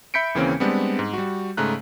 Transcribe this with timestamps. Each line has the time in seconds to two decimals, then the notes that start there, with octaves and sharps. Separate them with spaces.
0.14 E5 B5 G6 B6 C#7 D7
0.35 D#2 C#3 E3 A#3 C4 C#4
0.60 G3 G#3 B3 C4 D4
0.99 G#2
1.14 G3 F#4
1.57 G#2 C#3 A3 A#5 F#6